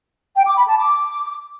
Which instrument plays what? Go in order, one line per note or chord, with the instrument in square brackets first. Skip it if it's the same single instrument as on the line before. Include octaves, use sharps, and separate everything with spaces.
[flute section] G5
D6
B5
A5
D6